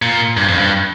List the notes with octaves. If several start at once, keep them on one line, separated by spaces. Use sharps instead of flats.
A#2
G2
F2
G2